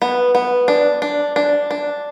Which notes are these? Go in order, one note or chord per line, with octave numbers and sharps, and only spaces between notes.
B3
B3
D4
D4
D4
D4